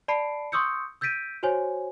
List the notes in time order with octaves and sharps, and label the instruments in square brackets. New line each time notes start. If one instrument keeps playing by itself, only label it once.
[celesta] D5 A5 B5 C7 D7
C6 C#6 D#6 E6 G6 C#7
E6 G6 A6 B6 D7 D#7
F#4 C5 C#5 G#5